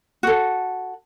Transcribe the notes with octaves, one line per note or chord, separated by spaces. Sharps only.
F#4 A4